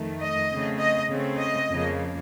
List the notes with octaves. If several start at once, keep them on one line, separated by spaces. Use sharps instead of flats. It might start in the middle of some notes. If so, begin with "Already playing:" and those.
Already playing: F2 D#3 A3
D#5
C#3 A3 C4
D#5
C#3 A3 C4
D#5
F2 C#3 F3 A#3